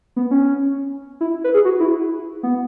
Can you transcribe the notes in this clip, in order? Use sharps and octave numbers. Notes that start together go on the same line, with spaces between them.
B3
C#4
E4
B4
G#4
F#4
E4
B3